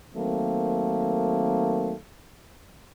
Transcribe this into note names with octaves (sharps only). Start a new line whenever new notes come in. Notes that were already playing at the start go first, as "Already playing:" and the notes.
D#3 F#3 A3 A#3 C4